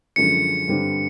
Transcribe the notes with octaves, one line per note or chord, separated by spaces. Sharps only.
F#2 D3 F3 G#3 C#4 C#7
G2 D3 G3 C4